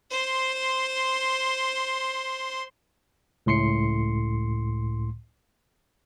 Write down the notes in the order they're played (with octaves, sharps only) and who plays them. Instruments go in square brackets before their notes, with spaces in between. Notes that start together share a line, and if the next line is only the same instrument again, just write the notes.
[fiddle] C5 C6
[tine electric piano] C#2 A2 C6 C7 C#7